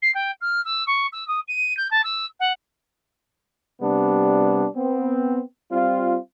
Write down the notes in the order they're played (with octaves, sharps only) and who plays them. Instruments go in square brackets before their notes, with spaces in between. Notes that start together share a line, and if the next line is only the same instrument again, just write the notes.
[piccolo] C7
G5
F6
E6
C#6
E6
D#6
D#7
G6
A5
E6
F#5
[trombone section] C3 G3 B3 D4
B3 C4
G3 C4 F4